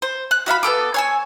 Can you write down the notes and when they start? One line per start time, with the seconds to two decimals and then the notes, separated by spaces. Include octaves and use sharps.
0.02 C5
0.31 F#6
0.46 F#4 E5 F5 B5
0.63 B3 G4 A4 D6
0.94 C#5 G#5 E6